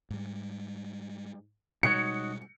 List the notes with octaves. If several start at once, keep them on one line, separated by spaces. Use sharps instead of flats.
G#2 G3
B2 G3 G#3 D#4 F#4 C#5 C#7